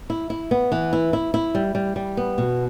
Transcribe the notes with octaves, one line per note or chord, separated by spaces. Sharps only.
E4
E4
B3
E3
E4
E4
E4
G3
G3
G3
B3
B2